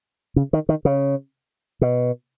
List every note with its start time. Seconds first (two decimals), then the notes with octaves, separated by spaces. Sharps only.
0.36 C#3
0.53 D#3
0.69 D#3
0.85 C#3
1.81 B2